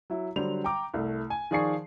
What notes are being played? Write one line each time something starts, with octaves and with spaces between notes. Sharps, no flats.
F#3 E4
D3 F#3 G3 C5 F7
G5 A#5 D6
C2 A3
G#5
D#3 F3 G#4 D5 C#6 C7